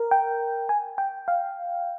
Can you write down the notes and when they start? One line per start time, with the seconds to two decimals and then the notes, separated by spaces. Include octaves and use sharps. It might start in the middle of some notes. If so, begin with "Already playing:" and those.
Already playing: A#4
0.11 G5
0.69 G#5
0.98 G5
1.28 F5